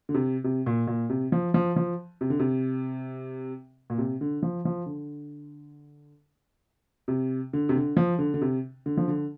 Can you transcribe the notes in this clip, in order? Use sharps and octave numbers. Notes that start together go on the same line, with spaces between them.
D3
C3
C3
A#2
A#2
C3
F3
F3
F3
C3
D3
C3
A#2
C3
D3
F3
F3
D3
C3
D3
C3
D3
F3
D3
D3
C3
D3
F3
D3